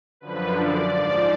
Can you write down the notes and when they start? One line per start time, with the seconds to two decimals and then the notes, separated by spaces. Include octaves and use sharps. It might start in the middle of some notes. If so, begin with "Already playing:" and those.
0.20 F#2 D3 F3 B4
0.55 D5
0.89 G#2 F3 D5